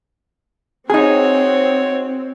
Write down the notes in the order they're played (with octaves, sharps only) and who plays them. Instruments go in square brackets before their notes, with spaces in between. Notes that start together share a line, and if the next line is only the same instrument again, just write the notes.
[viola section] C4 [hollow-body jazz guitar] D#4 G#4 [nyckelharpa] F#4 C#5